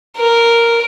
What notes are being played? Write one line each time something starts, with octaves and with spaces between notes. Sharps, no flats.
A#4